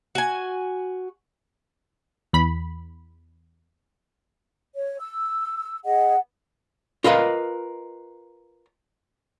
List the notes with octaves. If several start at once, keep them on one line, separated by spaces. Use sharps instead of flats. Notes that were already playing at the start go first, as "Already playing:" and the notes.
F#4 G#5
E2 B5
C#5
E6
G#4 D#5 F#5
F4 A#4 B4 D#5 F5